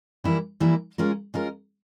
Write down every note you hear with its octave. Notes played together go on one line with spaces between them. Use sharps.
E3 G3 A#3 E4
E3 G3 A#3 E4
G#3 C#4 F4 A#4
G#3 C#4 F4 A#4